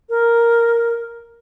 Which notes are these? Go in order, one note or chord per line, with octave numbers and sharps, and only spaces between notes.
A#4